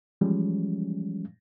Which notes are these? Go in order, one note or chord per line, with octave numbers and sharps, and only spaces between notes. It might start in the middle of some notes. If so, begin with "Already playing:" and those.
E3 F3 G3 G#3 C#4